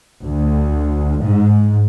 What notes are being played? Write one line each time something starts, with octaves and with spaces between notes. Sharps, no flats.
D2
G#2